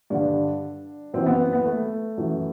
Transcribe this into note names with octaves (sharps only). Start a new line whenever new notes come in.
G2 D3 D4
F#2 E3 C4
B3
B3
A3
F#2 E3